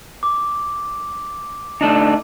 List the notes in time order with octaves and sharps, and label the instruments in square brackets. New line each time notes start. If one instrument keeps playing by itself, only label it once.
[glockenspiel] D6
[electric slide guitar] A3 D4 D#4